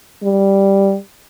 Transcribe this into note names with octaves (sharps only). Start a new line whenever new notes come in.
G3